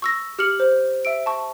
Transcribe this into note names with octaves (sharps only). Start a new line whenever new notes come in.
C#6 E6 A#6
G4 F6 C#7 F#7
C5
E5 E6 D7
A5 C#6